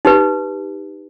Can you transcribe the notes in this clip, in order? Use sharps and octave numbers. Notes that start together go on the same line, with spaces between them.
D#4 G4 B4